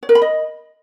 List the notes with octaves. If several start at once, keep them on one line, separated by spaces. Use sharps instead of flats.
C#5
A#4
B5
D#5